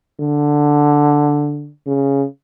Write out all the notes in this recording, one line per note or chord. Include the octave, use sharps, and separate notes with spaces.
D3
C#3